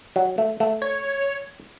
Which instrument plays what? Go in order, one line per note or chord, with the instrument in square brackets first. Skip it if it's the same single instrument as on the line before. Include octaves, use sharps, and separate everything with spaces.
[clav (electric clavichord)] F#3
A3
A3
[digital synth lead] C#5